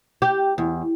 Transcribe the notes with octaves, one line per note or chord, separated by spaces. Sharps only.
G4
E2